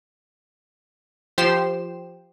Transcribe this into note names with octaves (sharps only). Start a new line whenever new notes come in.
F3 G4 C5 C7 E7